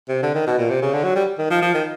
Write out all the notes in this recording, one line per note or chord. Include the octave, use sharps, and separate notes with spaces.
C3
D3
D#3
B2
A#2
C3
C#3
D3
F#3
G3
D#3
F3
F3
D#3